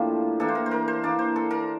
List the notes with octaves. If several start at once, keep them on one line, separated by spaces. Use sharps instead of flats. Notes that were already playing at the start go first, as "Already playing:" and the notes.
Already playing: A2 F3 A#3 D4 G4
E3 A#3 D4 A4
C5
A#4
C5
A#4
C5
E3 A#3 D4 D5
C5
A4
A#4